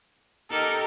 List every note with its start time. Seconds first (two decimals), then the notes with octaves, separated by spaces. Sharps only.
0.50 D#4 G4 A4 A#4